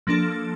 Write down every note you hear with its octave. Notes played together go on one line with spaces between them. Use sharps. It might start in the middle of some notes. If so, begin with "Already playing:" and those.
F3 A#3 D4 A4